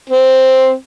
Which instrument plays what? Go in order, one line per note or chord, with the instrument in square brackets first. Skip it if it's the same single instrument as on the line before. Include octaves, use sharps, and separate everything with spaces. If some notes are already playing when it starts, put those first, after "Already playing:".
[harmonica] C4